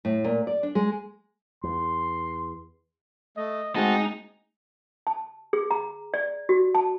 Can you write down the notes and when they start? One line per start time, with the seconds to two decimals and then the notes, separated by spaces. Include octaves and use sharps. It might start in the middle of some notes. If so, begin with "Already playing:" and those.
0.05 A2
0.24 A#2
0.47 D5
0.63 D4
0.75 G#3
1.64 E2 C6
3.37 A3 D#5
3.75 G#3 A3 C4 D#4 F#4 G#4 A5
5.07 A5
5.53 G#4
5.71 A#5
6.14 D5
6.49 F#4
6.75 A5